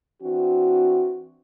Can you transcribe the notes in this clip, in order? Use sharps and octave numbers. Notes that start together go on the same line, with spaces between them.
E3 C4 D4 F#4